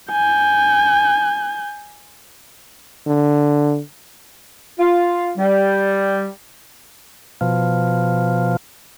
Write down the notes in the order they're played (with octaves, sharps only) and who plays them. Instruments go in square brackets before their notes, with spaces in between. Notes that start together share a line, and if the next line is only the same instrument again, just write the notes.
[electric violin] G#5 G6
[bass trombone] D3
[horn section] F4
G3
[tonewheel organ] B2 F3